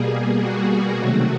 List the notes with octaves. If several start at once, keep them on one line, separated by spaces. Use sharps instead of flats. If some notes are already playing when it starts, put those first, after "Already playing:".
Already playing: B2 G3 A#3 G#4
G#4
F#4
C3 D#3 F#3 A3